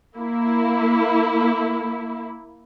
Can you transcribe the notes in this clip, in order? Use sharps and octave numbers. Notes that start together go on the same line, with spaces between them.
A#3 E4